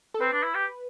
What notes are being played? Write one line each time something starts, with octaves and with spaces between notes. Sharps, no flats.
A4
C4 B4
D4
E4
G4